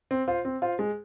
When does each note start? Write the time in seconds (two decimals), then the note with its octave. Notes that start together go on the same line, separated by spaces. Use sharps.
0.11 C4
0.28 F4 C5
0.45 C4
0.62 F4 C5
0.79 G#3